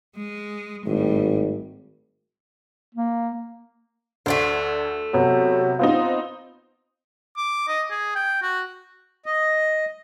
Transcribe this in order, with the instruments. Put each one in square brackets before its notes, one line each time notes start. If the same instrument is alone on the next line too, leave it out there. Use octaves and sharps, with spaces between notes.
[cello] G#3
[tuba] G#1 [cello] A2 G3
[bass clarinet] A#3
[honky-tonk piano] D2 F#5 [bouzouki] A3 D4 C5
[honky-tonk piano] C3 B3 [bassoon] F#3
[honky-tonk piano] B3 C4 D#4 [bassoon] F4
[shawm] D6
D#5
G#4
G5
F#4
[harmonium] D#5